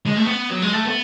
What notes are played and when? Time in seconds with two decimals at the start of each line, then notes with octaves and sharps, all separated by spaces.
0.06 G#3
0.16 A3
0.25 B3
0.49 F#3
0.62 G#3
0.73 A3
0.85 B3